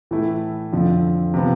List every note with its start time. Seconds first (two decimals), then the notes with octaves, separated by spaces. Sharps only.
0.11 A2 E3 A3 E4
0.73 F2 D3 F3
1.34 C3 F3 B3